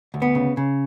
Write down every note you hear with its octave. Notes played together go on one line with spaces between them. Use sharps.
D2
B3
C#3
C#3